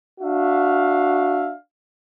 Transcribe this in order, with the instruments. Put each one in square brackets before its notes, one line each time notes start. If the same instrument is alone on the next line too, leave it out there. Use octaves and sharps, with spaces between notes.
[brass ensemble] D4 F#4 E5 F5